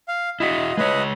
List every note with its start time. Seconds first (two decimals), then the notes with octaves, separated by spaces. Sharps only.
0.08 F5
0.40 E4 F#4 D#5
0.77 G#3 B4 C#5 D#5